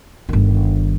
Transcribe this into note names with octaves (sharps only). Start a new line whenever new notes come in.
G1 D#3